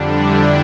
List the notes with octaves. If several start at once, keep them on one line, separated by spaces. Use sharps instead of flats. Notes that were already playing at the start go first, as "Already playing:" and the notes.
Already playing: F2 D3 G3 D4
E4